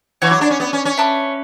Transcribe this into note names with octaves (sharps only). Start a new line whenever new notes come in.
E3 C#5 F#5 C#6
F#3
D4
C#4
B3
C#4
C#4
B4 E5 A5 D6